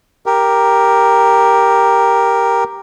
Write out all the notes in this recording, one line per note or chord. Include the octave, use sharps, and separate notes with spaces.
G4 A#4